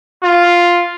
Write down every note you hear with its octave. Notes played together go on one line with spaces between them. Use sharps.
F4